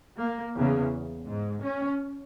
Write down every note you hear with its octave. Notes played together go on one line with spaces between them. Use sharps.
A#3
E2 C#3
G#2
C#4